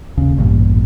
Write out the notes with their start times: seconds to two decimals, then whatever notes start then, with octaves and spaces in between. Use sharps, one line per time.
0.17 D#2 C#3
0.38 A1 E2 G2 A#2